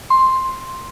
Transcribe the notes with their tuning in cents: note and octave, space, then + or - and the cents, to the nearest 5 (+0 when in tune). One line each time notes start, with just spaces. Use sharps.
C6 +5